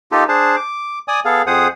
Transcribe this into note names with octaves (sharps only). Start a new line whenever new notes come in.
A#3 D#4 F4 G4 A4
D4 G#4 C5 A5
D6
D5 G#5 D#6
B3 G#4 A4 F5
F2 G#4 C5 F#5 D#6